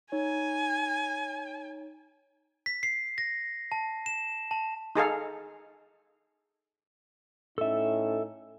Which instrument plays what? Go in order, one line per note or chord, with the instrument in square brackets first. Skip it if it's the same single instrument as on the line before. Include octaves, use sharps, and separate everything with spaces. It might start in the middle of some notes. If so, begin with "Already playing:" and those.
[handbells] D#4 C#5 [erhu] G#5
[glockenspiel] B6
C7
A#6
A5
E7
A5
[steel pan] D#4 G#4 A4 F5
[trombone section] A2 C#4 D#4 [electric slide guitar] A4 E5